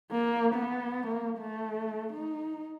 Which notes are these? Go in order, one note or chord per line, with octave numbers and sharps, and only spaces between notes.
A#3
B3
A#3
A3
D#4